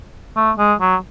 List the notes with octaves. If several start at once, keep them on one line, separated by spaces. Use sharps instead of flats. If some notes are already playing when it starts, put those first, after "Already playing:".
A3
G#3
F#3